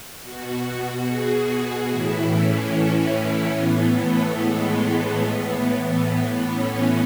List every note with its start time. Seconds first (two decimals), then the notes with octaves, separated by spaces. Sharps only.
0.21 B2 F#4
0.63 F#4
1.04 G#4
1.45 F#4
1.87 A2 E3 E4
2.29 C#4
2.71 C#4
3.54 A2 E3 B3
3.96 A3
4.37 G#3
4.79 A3
5.21 A2 E3 B3
6.45 C#4